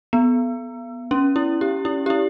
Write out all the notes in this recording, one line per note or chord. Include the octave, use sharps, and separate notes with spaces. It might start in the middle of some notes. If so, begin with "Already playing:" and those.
B3
C#4
E4
G4
E4
G4
E4